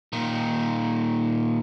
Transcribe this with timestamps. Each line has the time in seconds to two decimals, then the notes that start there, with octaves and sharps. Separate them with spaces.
0.13 A#2 D#3